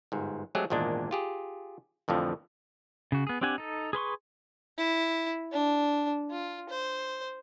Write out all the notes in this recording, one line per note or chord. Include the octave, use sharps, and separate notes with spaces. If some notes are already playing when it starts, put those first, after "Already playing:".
G1 G#2
F#3 G#3 A3 C4 G4 G#4
G#1 E2 A#2 G#3 D4
F4 G4 G#4
A1 F2 A2 D3 F3
C#3 F#4
B3 G#4
C4 D4 G4 F#5 G#5
D#4 A4
G#4 B4 C6 C#6
E4
D4
F4
C5